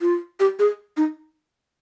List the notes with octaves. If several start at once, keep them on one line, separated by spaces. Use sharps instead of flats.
F4
G4
G#4
D#4